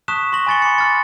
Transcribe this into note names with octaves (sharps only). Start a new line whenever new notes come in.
A5 C#6 D#6 F#6 B6 E7
C6 C#6 A#6 F#7
G#5 B5 A6 C#7 G7
B5 D6 C#7
C6 F6 A6